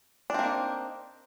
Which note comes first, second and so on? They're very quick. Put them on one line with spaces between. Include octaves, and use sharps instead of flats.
D4 C4 A#3 D#4